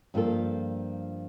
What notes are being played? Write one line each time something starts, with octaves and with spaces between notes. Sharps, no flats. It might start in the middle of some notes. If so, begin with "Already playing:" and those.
G2 F3 A#3 F4 A4